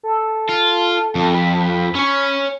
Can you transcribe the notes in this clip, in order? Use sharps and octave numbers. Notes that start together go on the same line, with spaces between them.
A4
F4
F2
B5
C#4 C#5